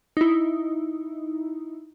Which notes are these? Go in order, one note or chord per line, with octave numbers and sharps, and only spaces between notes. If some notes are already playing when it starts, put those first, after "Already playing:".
D#4 E4